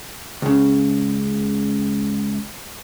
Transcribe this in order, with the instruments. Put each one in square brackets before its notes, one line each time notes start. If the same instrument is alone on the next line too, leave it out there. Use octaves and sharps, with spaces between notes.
[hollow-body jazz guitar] C#2 C#3